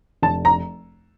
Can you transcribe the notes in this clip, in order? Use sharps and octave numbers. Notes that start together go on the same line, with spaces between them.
F1 A5
A#5